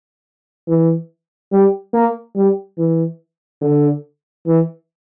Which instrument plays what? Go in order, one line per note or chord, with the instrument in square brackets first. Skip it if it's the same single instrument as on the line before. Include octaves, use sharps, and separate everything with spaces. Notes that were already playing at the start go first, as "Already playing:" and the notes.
[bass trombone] E3
G3
A#3
G3
E3
D3
E3